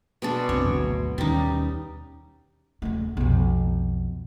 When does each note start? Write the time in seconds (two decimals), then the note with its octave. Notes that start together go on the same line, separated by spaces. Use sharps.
0.22 B2 G#3 D4
0.49 C2 F#2 C4 C#5
0.65 G#1 D2 F#3
1.18 D#2 D#3 G3 C#4 D#4
2.82 D#1 A3
3.17 B1 F2